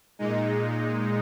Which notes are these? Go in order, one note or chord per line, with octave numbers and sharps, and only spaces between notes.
A#2 G#3 D#4